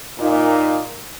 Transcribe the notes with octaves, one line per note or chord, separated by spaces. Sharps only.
A#2 D#4